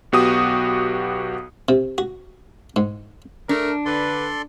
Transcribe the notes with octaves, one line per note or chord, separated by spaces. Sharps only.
B1 B3 F#4 G4 D#6
C3
F#4
G#2
A3 D4 A4 A#4
D3 A4 B4 D5 C6